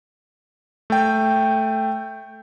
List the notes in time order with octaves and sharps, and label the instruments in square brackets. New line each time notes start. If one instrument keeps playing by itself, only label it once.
[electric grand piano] A3 G5